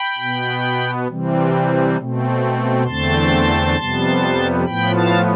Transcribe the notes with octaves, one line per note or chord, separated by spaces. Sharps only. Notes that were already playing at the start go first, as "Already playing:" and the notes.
Already playing: G5 B5
B2 B3
C3 E3 G3 C4
B2 A3 C4
E2 D3 A3 C4 A5 C6
F2 C3 G3 B3
A2 F3 B3 G5 B5
F5 A5